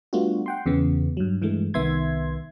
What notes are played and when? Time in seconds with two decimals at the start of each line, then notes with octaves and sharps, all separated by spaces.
0.13 G3 A3 B3 D4 F4 F#4
0.46 F#5 G5 C6
0.66 E2 C#3 E3 B3
1.17 G2 F#3
1.42 G2 E3 G#3 A3
1.74 C2 D#3 B3 E5 C6 G#6